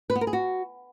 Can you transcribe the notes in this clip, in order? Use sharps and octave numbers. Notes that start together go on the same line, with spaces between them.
B4
B3
A#4
G#4
F#4